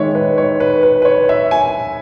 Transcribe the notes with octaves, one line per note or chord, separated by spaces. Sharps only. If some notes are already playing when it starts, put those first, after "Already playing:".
Already playing: D#3 G#3 C#5 E5
B4
C#5
B4
B4
B4
C#5
E5
G#5